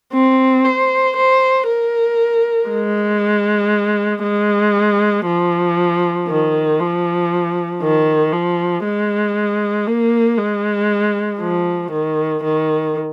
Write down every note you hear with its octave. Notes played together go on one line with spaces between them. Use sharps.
C4
C5
C5
A#4
G#3
G#3
F3
D#3
F3
D#3
F3
G#3
A#3
G#3
F3
D#3
D#3